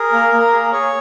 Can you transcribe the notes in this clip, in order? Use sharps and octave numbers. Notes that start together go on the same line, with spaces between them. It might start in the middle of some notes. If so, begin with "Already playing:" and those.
Already playing: G#4 A#4
A#3
A#3
G#4
G#4 C#5